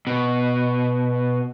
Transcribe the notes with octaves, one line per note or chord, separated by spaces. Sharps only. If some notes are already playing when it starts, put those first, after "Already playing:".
B2